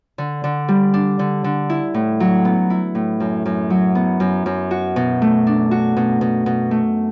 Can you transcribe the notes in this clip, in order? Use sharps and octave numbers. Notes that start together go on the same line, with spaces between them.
D3
D3
G3
D4
D3
D3
E4
A2
F#3
B3
E4
A2
F#2
F#2
F#3
B3
F#2
F#2
F#4
B2
A3
D4
F#4
B2
B2
B2
A3